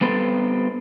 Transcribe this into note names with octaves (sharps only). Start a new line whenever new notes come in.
G3 B3 C4 A4